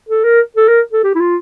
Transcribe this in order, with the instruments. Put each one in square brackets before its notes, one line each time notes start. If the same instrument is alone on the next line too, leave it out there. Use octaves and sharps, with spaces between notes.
[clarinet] A4
A#4
A4
A#4
A4
G4
E4
F4